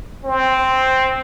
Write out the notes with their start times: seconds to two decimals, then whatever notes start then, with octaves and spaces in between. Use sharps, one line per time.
0.25 C4